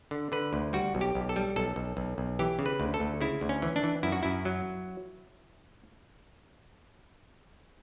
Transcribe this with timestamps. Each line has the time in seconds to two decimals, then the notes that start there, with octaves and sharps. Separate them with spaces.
0.11 D3
0.32 D3 B4
0.53 D2
0.73 G3 F#4
0.95 B1
1.01 G4
1.15 B1
1.29 A4
1.36 G3
1.56 B1 A4
1.76 B1
1.97 B1
2.18 B1
2.39 E3 G4
2.59 C#3
2.66 B4
2.80 D2
2.94 A4
3.00 D2
3.21 C#3 E4
3.41 D2
3.49 C#4
3.62 E3
3.76 D4
3.83 E3
4.03 F#2 E4
4.12 F#4
4.23 F#2 E4
4.45 F#3